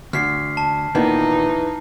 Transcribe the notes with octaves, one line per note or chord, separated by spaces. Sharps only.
D2 F6 B6 C7
A5
A#2 D#3 E3 B3 D#4